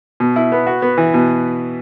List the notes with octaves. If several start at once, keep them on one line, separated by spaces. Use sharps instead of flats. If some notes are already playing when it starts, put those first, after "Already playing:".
B2
E4
B3
F#4
B3
E3
B2